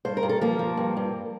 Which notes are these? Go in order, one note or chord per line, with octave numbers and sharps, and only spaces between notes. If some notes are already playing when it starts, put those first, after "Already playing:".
G2 C5
A#4
G2
A4
F3 A#3 A#4
F3
G2
G2